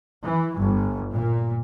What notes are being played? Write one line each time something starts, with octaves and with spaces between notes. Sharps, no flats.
E3
G1
A#2